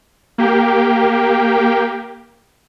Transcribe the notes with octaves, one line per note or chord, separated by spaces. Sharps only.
A#3 G4 G5